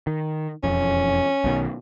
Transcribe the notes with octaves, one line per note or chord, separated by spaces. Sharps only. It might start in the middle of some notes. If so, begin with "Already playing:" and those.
D#3
E1 F2 C#4
B1 B2 D#3